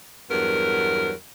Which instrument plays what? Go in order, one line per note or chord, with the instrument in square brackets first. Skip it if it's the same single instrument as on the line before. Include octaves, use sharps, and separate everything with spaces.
[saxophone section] E2 G2 F#3 B3 A#4